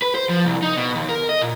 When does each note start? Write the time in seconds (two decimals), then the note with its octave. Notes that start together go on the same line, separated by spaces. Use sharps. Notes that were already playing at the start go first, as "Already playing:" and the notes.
0.02 B4
0.15 C5
0.29 F3
0.45 C2
0.62 D#4
0.77 B2
0.95 D#2
1.09 A#4
1.29 D#5
1.42 A#2